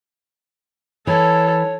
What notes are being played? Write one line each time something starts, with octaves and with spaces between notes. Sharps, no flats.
E3 A4 C#5